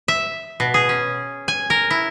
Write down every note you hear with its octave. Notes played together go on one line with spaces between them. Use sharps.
E5
B2
G#4
C#4
G#5
A#4
E4